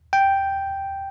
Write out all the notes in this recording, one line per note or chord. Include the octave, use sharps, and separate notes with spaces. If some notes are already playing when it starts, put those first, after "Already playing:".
G5